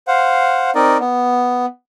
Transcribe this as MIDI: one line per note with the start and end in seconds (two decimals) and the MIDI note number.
0.08 0.70 72
0.08 0.70 77
0.08 0.70 78
0.75 0.97 60
0.75 0.97 63
0.75 0.97 70
0.75 0.97 74
0.75 0.97 75
1.00 1.66 59